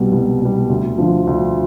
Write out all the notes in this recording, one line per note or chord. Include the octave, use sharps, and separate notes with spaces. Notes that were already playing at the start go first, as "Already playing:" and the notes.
Already playing: C2 B2 G3
C2
B2 G3
D2
D3 F3
D2